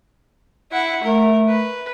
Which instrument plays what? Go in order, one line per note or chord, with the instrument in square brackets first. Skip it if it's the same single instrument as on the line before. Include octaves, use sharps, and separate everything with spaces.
[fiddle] E4 F#5
[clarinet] A3 [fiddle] A#4
[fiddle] B4